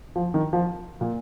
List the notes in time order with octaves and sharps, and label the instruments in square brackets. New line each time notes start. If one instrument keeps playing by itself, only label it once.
[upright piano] F3
D#3
F3
A#2